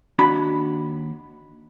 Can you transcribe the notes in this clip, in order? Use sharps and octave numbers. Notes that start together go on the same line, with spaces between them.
D#2 D4 F#4 B5